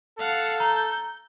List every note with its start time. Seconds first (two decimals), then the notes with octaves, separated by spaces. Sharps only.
0.19 A4 F5 F#5
0.60 A#5 G6